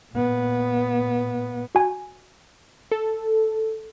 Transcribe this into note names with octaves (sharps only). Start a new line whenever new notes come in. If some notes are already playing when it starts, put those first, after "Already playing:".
A#2 B3
F#4 G#5
A4